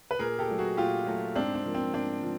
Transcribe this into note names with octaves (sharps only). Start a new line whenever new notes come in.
B4
A#2 G#4 A#4
G4 A4
F#3 A3
F#4 G#4
A#2 F4 G4
F#3 A3
G#2 C4 D4
C4
F3 A#3
C4
G#2 C4 D4
F3